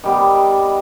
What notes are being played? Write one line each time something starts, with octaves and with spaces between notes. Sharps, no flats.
D#3 G3 B3